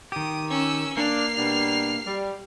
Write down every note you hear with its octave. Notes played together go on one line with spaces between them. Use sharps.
D#3 G4 D#6
C#4 E6
A#3 D4 F6 C7
B2 G3 D4
G3